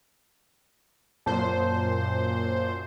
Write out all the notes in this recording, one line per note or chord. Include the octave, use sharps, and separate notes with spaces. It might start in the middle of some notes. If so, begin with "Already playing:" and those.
F#2 A#2 C5 A5